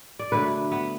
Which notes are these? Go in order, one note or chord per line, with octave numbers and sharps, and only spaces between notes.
D5
D3 F#3 A3 B4
B3